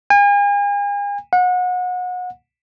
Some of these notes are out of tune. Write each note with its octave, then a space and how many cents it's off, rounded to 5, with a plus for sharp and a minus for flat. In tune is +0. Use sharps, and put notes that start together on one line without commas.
G#5 -40
F#5 -30